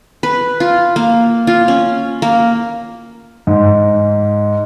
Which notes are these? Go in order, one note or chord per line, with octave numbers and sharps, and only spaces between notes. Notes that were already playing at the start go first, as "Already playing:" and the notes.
B4
F4
A#3
F4
C#4
A#3
G#2